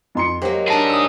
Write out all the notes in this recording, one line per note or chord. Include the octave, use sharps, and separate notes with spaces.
F2 C6 C#7
F#3 G#3 A#3 G4 C5
D4 D#4 G#4 G#5 A5 D7
D#6 E6